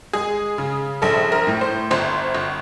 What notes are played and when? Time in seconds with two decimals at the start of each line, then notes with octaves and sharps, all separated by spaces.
0.13 G#3 G#4
0.58 C#3
1.02 A#1 A4
1.32 A#4
1.47 A2
1.61 C5
1.91 G1 C5
2.35 G1